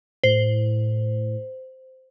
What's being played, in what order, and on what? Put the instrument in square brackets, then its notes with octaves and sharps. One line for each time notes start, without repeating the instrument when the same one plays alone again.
[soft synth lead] A2 [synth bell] C5